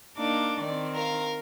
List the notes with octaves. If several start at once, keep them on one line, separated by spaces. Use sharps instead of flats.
A#3 D4 D#4 D6
D#3 C4 D5
A#4 F5